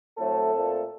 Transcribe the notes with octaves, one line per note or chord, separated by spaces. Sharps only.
A2 F#3 A3 C4 A4
A#2 A3 C4